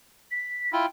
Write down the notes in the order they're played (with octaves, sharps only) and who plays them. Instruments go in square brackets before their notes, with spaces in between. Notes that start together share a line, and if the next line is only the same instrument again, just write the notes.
[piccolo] B6
[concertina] E4 F4 [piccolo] G5